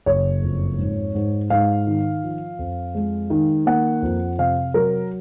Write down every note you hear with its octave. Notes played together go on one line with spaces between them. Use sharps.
F#1 C#5
F2
G#2
G#2
G#2 F5
D#3
F3
F2
G#3
D#3
A#3 F#5
F2
C3 F5
F#3 A#4